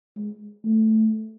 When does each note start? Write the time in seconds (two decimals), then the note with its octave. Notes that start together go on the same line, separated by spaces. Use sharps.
0.17 G#3
0.65 A3